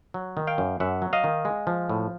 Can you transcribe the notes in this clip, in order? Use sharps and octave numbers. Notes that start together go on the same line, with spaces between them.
F#3
D#3
F5 G5
F#2
F#2 E5 F#5
F#3
D#5 F5
D#3
G#3
F3
A2